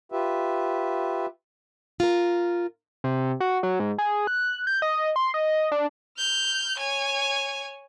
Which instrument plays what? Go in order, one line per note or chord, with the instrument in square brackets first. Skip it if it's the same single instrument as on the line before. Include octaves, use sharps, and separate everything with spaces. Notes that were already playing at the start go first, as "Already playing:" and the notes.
[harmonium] F4 G4 B4 E5
[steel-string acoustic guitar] F4 A#4
[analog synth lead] C3
F#4
F#3
G#2
G#4
F#6
G6
D#5
C6
D#5
D4
[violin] F6 G6
C#5 G#5